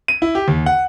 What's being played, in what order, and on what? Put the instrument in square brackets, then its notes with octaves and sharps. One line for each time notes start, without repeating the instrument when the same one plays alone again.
[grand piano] D#7
E4
G4
D#2
F#5